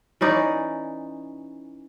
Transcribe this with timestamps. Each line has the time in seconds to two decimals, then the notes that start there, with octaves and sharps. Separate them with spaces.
0.21 E3 C#4 D#4 D5